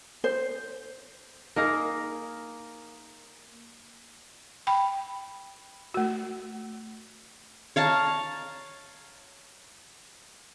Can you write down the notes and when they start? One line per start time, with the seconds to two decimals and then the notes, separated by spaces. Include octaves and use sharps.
0.24 C5
1.56 A#3 D#4 G#4 A#4
4.67 G5 B5
5.94 A3 F#4
7.76 C#5 F5 A5 A#5